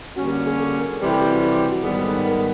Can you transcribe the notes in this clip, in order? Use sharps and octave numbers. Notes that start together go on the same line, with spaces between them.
D3 G3 A#3 C#4 F#4
G4
G#4
A4
A#4
C3 E3 G3 B4
A4
G4
F#4
G4
F#4
G#2 D#3 G3 B3 G#4
A4
A#4